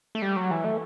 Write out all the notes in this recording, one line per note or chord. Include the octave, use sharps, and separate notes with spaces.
A3
G3
F#3
E3
A3